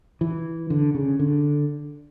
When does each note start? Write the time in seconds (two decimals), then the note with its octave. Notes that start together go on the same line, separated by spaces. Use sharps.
0.21 E3
0.70 D3
0.94 C#3
1.19 D3